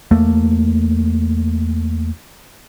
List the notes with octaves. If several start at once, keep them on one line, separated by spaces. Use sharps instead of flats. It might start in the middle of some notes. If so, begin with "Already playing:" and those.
E2 A3 A#3